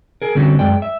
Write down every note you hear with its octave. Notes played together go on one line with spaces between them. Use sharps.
G#4 A#4
D3 G3 C4 C#4 F#4 G4
F#2 G#3 D5 G5
E5